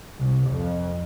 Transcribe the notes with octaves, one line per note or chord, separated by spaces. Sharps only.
C2
F2